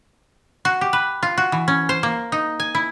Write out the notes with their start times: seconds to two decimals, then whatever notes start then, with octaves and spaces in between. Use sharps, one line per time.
0.65 F#4
0.81 G4
0.93 B4
1.23 F4
1.38 F#4
1.52 E3
1.68 C#4
1.89 C5
2.03 A#3
2.32 D#4
2.60 G#5
2.75 E4